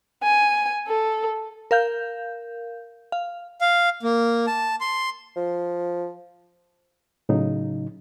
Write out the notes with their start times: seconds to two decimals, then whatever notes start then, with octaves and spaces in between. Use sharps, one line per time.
0.23 G#5
0.88 A4
1.71 A#4 F5 G6
3.12 F5
3.61 F5
4.03 A#3
4.47 A5
4.81 C6
5.36 F3
7.29 A2 C#3 F#3 D#4